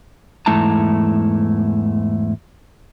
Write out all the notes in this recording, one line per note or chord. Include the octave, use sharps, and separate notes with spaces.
E2 G#2 A3 E4 A5 A#5